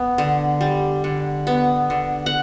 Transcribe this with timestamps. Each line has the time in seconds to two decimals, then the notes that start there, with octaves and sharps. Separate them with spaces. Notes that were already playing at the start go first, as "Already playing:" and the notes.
Already playing: B3
0.18 D3
0.61 G3
1.04 D3
1.47 B3
1.90 D3
2.26 F#5